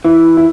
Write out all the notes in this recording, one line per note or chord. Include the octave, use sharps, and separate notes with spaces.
E3 E4
E4